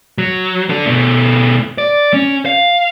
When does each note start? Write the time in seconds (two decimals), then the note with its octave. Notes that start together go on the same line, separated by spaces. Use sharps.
0.18 F#3
0.70 D4 A4
0.86 B2 A3
1.78 D5
2.14 C#4
2.46 F5